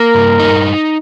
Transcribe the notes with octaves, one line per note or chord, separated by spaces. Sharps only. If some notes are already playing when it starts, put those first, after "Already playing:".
Already playing: A#3 A#4
G2
D#4